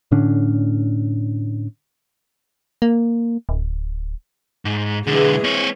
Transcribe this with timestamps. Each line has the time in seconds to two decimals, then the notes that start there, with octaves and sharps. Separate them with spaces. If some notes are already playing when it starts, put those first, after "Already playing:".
0.12 A2 D3 C#4 D4
2.82 A#3
3.49 D1
4.65 G#2
5.07 B1 D3 E3 G#3 G#4
5.44 C4 C#5